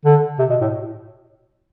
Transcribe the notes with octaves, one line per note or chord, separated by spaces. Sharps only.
D3
C3
B2
A2